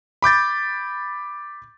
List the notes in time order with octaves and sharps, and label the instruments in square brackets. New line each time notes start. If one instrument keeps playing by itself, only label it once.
[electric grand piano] B5 D6 G6 A6